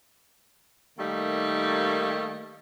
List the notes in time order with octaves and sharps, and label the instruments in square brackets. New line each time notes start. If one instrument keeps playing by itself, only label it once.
[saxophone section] D#3 G3 A3 A#3 D#4